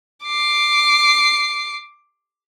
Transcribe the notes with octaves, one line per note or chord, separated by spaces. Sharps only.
D6 C7